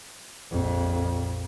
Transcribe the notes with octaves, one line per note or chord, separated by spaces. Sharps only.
A#1 F2